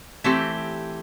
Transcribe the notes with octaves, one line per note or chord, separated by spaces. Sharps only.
E3 A3 C4 G4